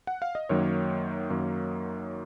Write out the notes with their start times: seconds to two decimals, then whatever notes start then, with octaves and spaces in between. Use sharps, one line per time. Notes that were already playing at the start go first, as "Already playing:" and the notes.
0.07 F#5
0.22 F5
0.35 D#5
0.49 F#2 D#3 F#3 A#3 C#5
1.30 F#2 D#3 F#3 A#3